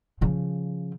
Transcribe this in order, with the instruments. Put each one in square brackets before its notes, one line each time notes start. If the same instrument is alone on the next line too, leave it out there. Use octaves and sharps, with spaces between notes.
[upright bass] C#3 F3